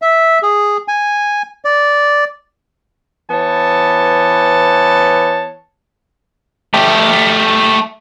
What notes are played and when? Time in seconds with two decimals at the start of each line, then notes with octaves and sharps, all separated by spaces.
0.02 E5
0.42 G#4
0.88 G#5
1.65 D5
3.31 E3 B3 C#5 A5
6.74 A3 G4